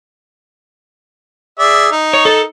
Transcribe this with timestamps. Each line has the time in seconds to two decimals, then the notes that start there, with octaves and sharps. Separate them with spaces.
1.59 G#4 D5 E5
1.91 D#4
2.13 C#5
2.25 A4